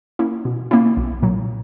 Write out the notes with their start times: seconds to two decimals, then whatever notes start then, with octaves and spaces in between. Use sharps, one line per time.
0.19 A#3 C#4 E4
0.45 B2
0.71 A#3 C#4 E4
0.97 B1
1.22 A#2 F#3